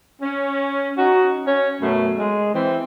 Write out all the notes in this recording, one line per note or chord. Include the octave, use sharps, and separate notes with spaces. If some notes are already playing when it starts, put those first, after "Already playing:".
C#4
C#4 D#4 F#4
C#4 C#5
F#2 B2 A3
G#3
E3 C4